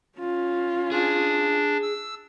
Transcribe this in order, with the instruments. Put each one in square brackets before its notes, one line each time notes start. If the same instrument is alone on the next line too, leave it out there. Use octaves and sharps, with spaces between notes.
[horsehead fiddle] C#4 F4
[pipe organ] D4 [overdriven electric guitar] G#4
[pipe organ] E6